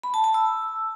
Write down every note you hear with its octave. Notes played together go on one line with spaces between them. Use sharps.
B5
A5
A5
E6